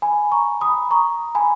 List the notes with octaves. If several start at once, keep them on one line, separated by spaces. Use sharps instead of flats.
G#5 B5
A#5 C#6
B5 D#6
A#5 C#6
G#5 B5